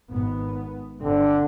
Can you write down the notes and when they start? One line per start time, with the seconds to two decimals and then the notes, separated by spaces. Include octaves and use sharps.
0.10 G#1 B3
1.02 G1 D3 C4